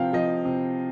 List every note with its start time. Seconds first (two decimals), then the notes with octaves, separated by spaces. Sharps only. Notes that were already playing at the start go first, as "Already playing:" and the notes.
Already playing: C3 F3 F5 G5
0.13 F3 D#5
0.45 C3